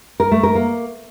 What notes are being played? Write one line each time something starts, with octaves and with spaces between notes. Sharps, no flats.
A#4
A3
A#4
A#3